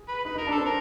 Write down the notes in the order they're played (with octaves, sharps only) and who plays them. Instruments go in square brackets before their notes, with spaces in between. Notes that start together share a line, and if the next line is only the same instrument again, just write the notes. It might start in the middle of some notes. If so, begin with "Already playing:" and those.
Already playing: [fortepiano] G#4
[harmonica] B4
[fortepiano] D#4 [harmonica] B4
[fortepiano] D#4 [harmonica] A#4
[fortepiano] D4 [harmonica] A4
[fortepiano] C4
[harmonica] A#4